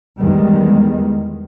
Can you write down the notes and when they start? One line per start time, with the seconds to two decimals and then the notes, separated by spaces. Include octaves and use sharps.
0.19 E2 D#3 G3 G#3